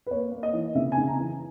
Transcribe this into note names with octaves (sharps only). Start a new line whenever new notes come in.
B4
A#3 C#5
A#3
D#5
E3
C#3 E5
G#5
C#3
A#5
E3